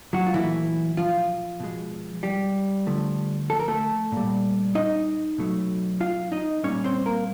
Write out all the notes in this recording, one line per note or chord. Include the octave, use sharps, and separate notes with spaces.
F#3 F#4
F4
A#2 E3 F#3 A3 E4
F3 F4
B2 G#3
G3 G4
D3 F3 A3
A4
A#4
A3 A4
A#2 G3
D#4 D#5
B2 F#3 A3
F4 F5
D#4 D#5
A#2 G3 C#4 C#5
C4 C5
A#3 A#4